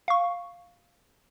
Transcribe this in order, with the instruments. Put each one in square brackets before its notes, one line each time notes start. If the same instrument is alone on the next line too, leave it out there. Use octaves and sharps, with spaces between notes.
[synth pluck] F5 C#6